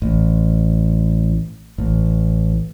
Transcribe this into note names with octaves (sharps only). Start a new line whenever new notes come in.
A1
A1